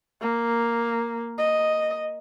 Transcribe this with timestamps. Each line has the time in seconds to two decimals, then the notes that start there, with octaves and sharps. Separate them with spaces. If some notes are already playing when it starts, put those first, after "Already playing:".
0.21 A#3
1.38 D#5